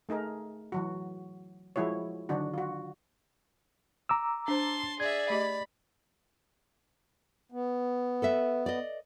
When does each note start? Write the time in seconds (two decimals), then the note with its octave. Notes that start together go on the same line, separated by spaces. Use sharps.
0.09 A3 D#4 G#4 A#4
0.72 E3 F#3 F#4
1.76 F3 G#3 E4 F#4 C#5
2.29 D3 D#3 F#3 D4 F#4
2.54 F4 F#4
4.09 A#5 D6 E6
4.48 D4 C5 A5 C6
5.00 G#4 D5 E5 G#6
5.30 A3 G4 D#5 B5
7.52 B3
8.22 A4 B4 E5
8.66 D5 D#5